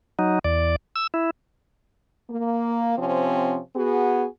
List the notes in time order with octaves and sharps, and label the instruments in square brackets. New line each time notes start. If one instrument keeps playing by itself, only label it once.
[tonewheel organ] F#3 D#4
E2 D5
E6
E4
[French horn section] A#3
C3 F3 C4 C#4
B3 F#4 G#4